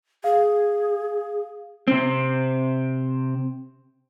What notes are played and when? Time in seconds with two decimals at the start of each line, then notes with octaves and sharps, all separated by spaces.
0.24 G#4 F5
1.88 C3 C4